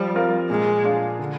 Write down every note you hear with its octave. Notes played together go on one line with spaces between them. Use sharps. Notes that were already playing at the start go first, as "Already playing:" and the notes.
Already playing: F3 G3
C4 F4 A#4
A#2 G#3
G#3 D4 F4
D3